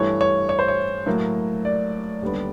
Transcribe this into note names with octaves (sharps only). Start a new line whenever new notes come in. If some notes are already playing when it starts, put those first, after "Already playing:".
Already playing: G2 E3 A3 C#5
C#5
C#5
C5
C#5
A2 F#3 A#3
D5
D#2 D3 G3 B3